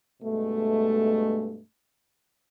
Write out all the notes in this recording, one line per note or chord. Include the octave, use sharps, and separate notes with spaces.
G2 B2 G#3 A3